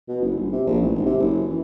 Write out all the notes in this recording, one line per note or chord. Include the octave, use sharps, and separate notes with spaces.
B2
F#1
G1
C3
A#1
A1
G#1
C3
F#1
E3